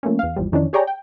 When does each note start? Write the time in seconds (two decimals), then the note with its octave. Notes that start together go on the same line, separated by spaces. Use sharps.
0.03 F3 A3 A#3 C#4
0.19 E2 F5
0.36 G#1 E2 F3 G3
0.52 F2 D#3 E3 C#4 D4
0.73 G4 G#4 C#5 D5 G5 A#5
0.87 G5